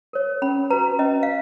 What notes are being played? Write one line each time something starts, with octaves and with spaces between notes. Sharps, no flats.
A#4 C#5
C#4 B5
F#4 B4 A#5
C#4 D#5
F5